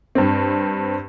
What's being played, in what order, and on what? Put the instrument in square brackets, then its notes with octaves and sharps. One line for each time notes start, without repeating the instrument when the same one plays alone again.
[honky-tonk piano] G2 C4